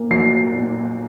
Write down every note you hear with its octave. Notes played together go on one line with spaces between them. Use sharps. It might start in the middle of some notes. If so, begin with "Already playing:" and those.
Already playing: A#2 A#3
F#3 C7
A#2